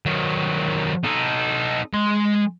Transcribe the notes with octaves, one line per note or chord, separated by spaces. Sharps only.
D#3 F#3
D#4 A4
G#3 C6